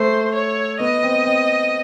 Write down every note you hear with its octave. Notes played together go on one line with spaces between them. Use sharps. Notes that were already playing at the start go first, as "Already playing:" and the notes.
Already playing: A3 C5
C#5
B3 D#5
C4
C4